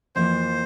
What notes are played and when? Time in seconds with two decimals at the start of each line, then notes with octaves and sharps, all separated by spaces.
0.15 F2 E3 A#3 C5